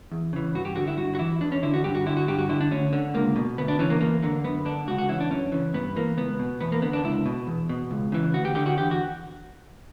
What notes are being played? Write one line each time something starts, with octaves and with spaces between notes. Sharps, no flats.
E2
C#3 E3
G2 F#4
G4
D3 F#4
E4
G2 F#4
F#4
E3 E4
E2 D4
C#4
D3 E4
F#4
G2 G4
F#4
D3 E4
F#4
G2 G4
F#4
D3 E4
D4
D2 C#4
D3
C#2 A#3
B2
D2 B3
D4
C#3 E3 C#4
A#3
E2 A#3
D3 A#3
F#2 B3
D3 D4
C#2 F#4
F#4
C#3 E3 E4
D4
F#2 C#4
C#3 E3
G2 B3
E3 A#3
C#2 B3
B2
E2 B3
A#3
D3 B3
D4
C#2 E4
B2
E2
B2
C#2
C#3 E3
D2 F#4
G4
D3 G4
F#4
E2 G4
F#4